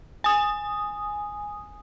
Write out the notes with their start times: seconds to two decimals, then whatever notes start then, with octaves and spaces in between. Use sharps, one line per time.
0.24 G#5 D#6